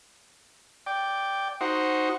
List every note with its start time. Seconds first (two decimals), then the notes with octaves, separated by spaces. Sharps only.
0.86 D5 G5
1.61 D#4 F#4 C5